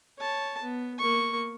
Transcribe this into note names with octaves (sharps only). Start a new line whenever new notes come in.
C#5 A5
B3
A#3 C#6